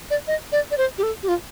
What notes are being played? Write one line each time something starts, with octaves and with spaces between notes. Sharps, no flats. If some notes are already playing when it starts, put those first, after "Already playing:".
D5
D#5
D5
D5
C5
G4
A4
G4
F4